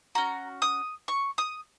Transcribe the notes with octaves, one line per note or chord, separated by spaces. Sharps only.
C#4 F#4 A#5
D#6
C#6
D#6